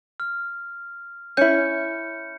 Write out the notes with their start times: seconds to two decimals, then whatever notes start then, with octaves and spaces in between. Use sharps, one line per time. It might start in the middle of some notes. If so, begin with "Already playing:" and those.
0.20 F6
1.37 C#4 E4 G6 C#7